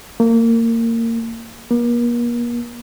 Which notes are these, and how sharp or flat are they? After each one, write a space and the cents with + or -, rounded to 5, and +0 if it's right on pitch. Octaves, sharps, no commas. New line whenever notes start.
A#3 -25
A#3 +40